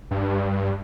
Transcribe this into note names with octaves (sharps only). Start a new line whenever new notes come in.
G2